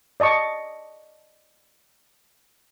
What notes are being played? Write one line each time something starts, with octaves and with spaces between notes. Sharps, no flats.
D5 D#5 A5 C#6 D6